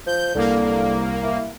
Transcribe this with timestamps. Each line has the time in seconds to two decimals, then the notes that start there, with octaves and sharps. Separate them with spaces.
0.07 F3 G6
0.35 C2 D3 A#3
1.23 E4